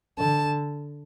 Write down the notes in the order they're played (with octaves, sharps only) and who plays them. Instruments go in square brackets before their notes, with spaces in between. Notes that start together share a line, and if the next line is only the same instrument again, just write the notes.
[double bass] D3 [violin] A5